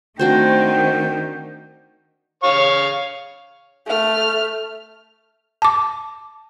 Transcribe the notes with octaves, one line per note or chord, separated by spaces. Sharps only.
D#3 A3 C4 D4 F#4 C5 G5
C#5 F5 C#6
A3 F6
A5 D6